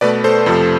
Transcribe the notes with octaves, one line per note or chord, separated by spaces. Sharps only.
B2 A3 B4 D5
A4 C5
F2 C3 F3 A3